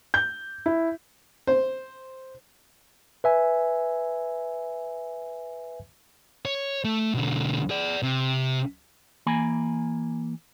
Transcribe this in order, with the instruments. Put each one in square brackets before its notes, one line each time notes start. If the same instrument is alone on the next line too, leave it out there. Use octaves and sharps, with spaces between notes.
[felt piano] G6
E4
[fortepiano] C5
[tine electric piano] B4 E5 G#5
[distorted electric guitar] C#5
A3
B1 D3
G#4 D5
C3
[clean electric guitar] E3 A#3 G#5 B5